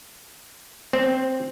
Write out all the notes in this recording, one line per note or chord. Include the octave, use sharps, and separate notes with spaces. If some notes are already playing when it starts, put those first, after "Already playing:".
C4